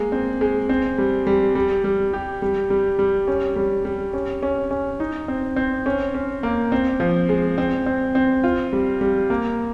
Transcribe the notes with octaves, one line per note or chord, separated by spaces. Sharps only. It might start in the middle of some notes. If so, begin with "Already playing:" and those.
Already playing: G#3 A#3
C4
G#3
C4
G3
G3
G3
G3
G4
G3
G3
G3
C#4
G3
G3
C#4
C#4
C#4
D#4
C4
C4
C#4
C#4
A#3
C4
F3
G#3
C4
C4
C4
F4
G3
G3
A#3